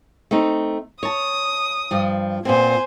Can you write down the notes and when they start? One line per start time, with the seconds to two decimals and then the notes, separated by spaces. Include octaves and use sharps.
0.31 A3 C4 D#4
1.03 C#5 A5 D#6
1.91 G2 F3
2.45 A#2 B3 C4 C5 G#5